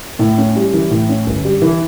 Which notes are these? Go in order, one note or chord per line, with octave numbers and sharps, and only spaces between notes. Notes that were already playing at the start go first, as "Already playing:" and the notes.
A2
C#4
G3
E3
A2
C#4
G1
G3
E3